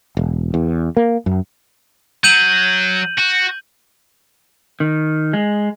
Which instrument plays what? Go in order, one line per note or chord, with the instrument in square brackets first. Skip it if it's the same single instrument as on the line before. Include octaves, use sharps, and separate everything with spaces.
[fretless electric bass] E1
E2
A#3
F#2
[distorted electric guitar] F#3 [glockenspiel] G6 D#7 F#7
[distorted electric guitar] F#4
[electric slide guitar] D#3
G#3